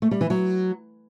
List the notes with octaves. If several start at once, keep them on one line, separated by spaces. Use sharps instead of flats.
A3
G3
E3
F#3